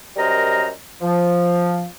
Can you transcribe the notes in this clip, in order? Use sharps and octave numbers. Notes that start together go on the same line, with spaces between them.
F#2 G3 A#4 C5 D#5 A#5
F3